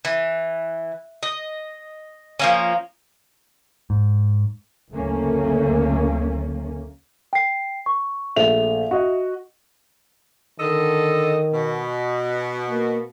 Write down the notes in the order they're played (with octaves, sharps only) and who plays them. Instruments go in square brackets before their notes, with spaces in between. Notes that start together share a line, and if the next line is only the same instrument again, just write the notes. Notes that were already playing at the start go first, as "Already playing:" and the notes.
[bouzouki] E3
D#5
F3 A#3 C#4
[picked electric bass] G#2
[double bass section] F#1 D2 A3 A#3 C#4
[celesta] G5 C7
C#6
[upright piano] A#1 A3 F7 [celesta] E5
[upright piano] F#4 D#5
[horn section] D3 A4 D#5 [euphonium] D#3
[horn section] B2
[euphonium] A#3